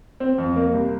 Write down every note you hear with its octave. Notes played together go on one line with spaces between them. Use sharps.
C4
F2
A#3
C2